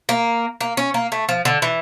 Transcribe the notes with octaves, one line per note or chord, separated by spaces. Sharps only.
A#3
A#3
C#4
A#3
A3
F3
D3
E3